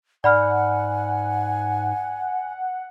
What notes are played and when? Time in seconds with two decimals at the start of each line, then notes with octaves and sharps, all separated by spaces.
0.24 G#2 D5 F#5 G#5 B5 F6